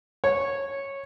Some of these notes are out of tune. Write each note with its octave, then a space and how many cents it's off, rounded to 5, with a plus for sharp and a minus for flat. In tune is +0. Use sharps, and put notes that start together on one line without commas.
C#5 -10